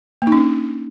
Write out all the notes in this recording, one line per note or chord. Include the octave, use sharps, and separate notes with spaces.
A#3
D#4
C#4
D4